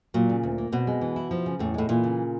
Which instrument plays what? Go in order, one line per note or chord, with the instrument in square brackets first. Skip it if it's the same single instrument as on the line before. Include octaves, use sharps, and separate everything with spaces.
[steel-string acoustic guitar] A#2 [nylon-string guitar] F#3
[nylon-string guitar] C#3
D2
A#3
[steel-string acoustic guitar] B2 [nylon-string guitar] C4
[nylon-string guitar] G#3
E3
E4
F3
C#3
[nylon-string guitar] E2 [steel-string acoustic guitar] A2
[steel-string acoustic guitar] A2 [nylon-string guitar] G#3
[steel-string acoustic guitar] A#2 [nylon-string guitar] E3
[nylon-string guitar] C#3